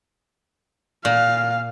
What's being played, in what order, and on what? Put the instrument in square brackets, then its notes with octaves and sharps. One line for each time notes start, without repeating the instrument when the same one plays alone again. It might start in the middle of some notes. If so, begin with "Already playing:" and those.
[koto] A#2 [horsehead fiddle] F5